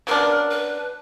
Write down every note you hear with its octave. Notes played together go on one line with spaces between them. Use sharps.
C#3 F#3 B3 D4 A#4
B4